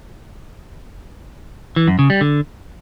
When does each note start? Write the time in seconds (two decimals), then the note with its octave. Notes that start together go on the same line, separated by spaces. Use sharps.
1.76 E3
1.88 F#2
1.99 C#3
2.10 G3
2.21 D3